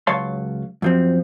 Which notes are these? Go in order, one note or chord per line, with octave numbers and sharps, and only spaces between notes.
C#2 F#3 C#5 F5 A5 C6
F#2 F3 C4